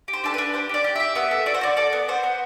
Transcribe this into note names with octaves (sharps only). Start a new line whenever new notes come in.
G4
C5
D4 A4
D4 B4
G4 C5
G4 D5
G4
G4 E5
B3 E5
A4
F#4 D5
C5
F#4 D5
A4 D5
B3
F#4 C5
B3